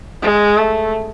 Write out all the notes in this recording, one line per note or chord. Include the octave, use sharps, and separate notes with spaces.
G#3
A3